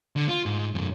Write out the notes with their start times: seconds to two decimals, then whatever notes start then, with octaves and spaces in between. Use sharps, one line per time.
0.16 D3
0.29 F4
0.46 G#2
0.75 B1 F#2